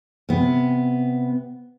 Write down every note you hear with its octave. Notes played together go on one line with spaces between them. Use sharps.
C3 B3